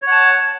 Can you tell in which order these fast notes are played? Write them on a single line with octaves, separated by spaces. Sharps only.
C#5 F#5 A5